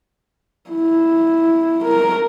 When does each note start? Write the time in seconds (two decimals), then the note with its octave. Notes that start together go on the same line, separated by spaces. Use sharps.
0.70 E4
1.83 A#4